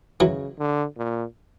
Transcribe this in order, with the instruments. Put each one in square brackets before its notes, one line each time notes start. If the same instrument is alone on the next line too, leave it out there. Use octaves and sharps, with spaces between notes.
[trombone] C#3 [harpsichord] E3 F#3
[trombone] D3
A#2